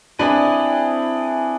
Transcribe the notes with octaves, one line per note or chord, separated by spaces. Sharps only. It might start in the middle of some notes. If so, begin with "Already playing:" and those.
C4 D4 E4 G#4 B4